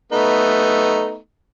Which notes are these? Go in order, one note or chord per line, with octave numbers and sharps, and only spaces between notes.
A3 B3 D#4